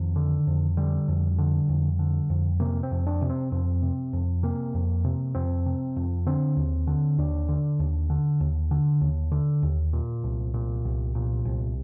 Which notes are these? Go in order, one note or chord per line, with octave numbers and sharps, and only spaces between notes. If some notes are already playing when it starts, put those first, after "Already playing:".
Already playing: F2 D#3
D3
F2
D3 G3
F2
D3
F2
D3
F2
C3 A#3
C4
F2
D4
C3
C4
F2 C4
C3
F2
C3 A#3
F2
C3
F2 C4
C3
F2
D3 C4
D#2
D3
D#2 D4
D3
D#2
D3
D#2
D3
D#2
D3
D#2
A#2
C2
A#2
C2
A#2
C2